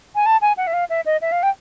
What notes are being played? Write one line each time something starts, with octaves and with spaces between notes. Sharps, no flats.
G#5
A5
G#5
F#5
E5
F5
E5
D#5
E5
F5
G5